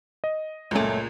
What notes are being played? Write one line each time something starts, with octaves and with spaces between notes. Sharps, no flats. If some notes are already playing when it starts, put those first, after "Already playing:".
D#5
C#2 F#2 A#2 A3